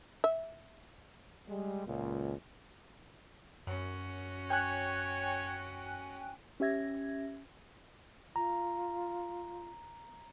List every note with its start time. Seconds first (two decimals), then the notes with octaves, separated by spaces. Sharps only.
0.24 E5
1.48 G3 G#3
1.86 C#2 A#2
3.67 F#2 C#4 F#4
4.50 C#5 G5 G#5 F#6
6.60 C#4 G4 E5 G#6 A#6
8.36 F4 A#5